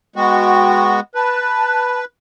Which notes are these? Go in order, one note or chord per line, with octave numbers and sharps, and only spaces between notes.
G#3 B3 F#4 F#5 G5
B4 A5 F#6